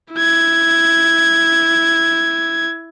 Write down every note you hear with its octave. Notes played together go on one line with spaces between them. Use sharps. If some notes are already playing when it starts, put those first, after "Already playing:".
E4 G#6